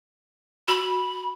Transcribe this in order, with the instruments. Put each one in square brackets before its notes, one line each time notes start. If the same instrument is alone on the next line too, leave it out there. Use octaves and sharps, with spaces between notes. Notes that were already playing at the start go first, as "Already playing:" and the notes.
[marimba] F#4 [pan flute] B5